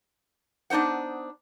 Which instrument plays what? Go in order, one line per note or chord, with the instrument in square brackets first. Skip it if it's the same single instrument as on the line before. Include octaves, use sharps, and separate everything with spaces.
[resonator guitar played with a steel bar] B3 D4 D#4 C5 F#5